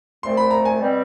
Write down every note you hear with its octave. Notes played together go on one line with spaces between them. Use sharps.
C2 A#2 F3 A3 C4 C6
B5
A#5
G#5
B2 G3 C4